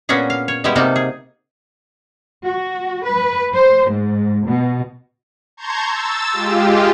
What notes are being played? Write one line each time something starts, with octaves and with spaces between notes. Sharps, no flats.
A#2 B3 C#4 D4 F#4 G#4
F5
C#5
G3 G#3 B3 E4 G4
C3 G3 A#3 D#4 F#5 A5
G#4
F#4
B4
C5
G#2
B2
A5 A#5 C6 C#6 G6 G#6
E6 A6
G#3 F4 G4